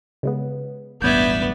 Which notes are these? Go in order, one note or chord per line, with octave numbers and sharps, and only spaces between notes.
C#3 G#3 B3
E1 A1 G2 B3 D5 E5 G6 G#6